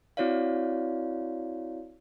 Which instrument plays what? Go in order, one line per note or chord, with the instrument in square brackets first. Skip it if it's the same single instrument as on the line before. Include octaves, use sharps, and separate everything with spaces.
[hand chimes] C4 E4 F#4 C#5 D5 F5